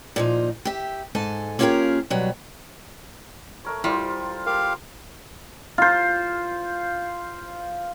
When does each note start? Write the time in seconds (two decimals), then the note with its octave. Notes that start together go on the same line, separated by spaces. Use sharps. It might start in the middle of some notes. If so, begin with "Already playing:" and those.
0.16 A#2 F3 D#4
0.65 G4 E5
1.15 G#2 A4 G#5 A5
1.59 A#3 C#4 F4 G4 G#4 A#4
2.10 B2 F#3 G3
3.65 A3 A#4 C#5
3.84 G3 E4 F4 C5 D5
4.46 G4 A#4 F5
5.78 F4 C5